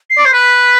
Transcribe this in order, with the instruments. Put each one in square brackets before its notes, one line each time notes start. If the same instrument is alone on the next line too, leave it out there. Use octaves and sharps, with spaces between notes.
[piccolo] C7
[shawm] D5
C5
[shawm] B4 [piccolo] B6